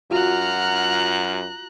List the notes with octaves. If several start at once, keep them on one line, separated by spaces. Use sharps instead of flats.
F#2 F4 F#4 F#5 A#5 F6 F#6